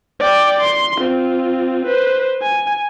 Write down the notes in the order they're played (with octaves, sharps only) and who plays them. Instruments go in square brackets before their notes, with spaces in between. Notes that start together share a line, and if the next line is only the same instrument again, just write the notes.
[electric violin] D5 G5
C6
C4 F4
B4 C5
G#5